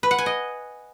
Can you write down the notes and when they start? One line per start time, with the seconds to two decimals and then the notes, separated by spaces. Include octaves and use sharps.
0.03 B4
0.11 F#5
0.18 G#5
0.26 D#5